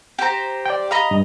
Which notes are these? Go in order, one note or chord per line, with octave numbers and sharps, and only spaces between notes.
G4 C5 A#5
D5 G5
D#5 F5 A#5 B5 D#6
G2